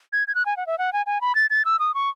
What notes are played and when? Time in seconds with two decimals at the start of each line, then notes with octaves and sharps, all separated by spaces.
0.13 G#6
0.28 G#6
0.35 F#6
0.46 G#5
0.57 F#5
0.67 E5
0.78 F#5
0.93 G#5
1.06 G#5
1.21 B5
1.35 A6
1.50 A6
1.65 E6
1.79 D#6
1.94 C#6